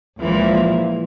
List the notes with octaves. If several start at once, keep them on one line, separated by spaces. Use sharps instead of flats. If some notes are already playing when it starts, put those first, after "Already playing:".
C#2 A#2 E3 F3